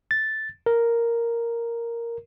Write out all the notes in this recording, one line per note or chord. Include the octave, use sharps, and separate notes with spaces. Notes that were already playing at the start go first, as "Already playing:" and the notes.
A6
A#4